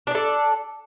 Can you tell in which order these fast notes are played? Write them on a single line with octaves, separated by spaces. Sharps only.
D4 D5 A4